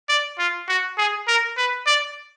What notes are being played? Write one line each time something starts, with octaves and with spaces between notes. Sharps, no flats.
D5
F4
F#4
G#4
A#4
B4
D5